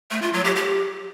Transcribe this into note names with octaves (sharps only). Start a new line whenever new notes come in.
A3
F4
F#3
G4
G4